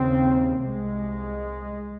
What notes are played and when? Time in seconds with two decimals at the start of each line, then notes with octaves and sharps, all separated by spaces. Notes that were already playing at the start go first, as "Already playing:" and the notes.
Already playing: D#2 C#3 C4
0.61 C2 C3 G#3